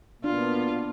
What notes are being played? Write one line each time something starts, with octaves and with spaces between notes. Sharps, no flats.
B2 A#3 B3 D4 F4